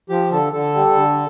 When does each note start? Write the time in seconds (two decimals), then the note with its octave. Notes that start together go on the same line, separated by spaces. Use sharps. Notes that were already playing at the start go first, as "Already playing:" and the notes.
0.09 F3 G4
0.31 D3 A4
0.53 D3 A4
0.74 G3
0.96 D3